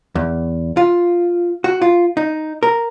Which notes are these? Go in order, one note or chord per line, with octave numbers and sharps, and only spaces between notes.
E2
F4
F#4
F4
D#4
A#4